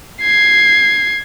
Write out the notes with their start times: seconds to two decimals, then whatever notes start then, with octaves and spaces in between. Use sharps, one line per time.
0.22 G#6 C7